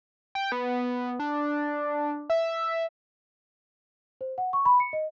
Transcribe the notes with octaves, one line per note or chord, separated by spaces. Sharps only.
G5
B3
D4
E5
C5
F#5
C#6
B5
C#7
D#5